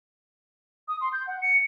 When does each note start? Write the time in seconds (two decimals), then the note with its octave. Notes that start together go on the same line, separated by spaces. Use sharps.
0.88 D#6
1.01 C6
1.13 G6
1.27 F#5
1.42 C#7